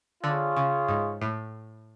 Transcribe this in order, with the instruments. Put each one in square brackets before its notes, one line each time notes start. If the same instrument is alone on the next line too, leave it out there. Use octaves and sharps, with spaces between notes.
[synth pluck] D3 [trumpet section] F4 G#4 C#5
[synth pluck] C#3
G#2
A2